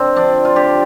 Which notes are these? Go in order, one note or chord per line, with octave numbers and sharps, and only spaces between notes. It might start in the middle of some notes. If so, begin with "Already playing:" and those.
Already playing: D3 C4
F3 D4
F4
D3 G4